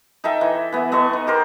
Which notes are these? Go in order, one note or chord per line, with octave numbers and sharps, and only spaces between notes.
D#4 A4 E5 G5
E3
E3 B3
B3 A4 D#5 C#6
D#4
G4 A#4 C5